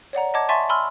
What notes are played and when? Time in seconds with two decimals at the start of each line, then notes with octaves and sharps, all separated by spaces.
0.13 C#5 D5 F#5 A#5
0.34 D#5 F#5 A5 D6 G#6
0.49 E5 G#5 A5 C6 C#6 A6
0.69 G#5 B5 C6 E6 F6